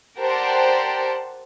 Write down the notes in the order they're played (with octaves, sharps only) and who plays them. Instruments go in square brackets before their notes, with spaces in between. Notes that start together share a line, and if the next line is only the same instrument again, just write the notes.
[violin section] G4 A#4 C5 D5 F#5 A5